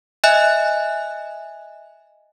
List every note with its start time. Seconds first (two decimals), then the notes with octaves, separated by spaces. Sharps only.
0.24 D#5 E5 G#5 F#6